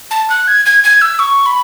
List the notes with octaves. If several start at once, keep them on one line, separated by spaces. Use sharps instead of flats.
A5
F#6
G#6
G#6
G#6
E6
C#6
B5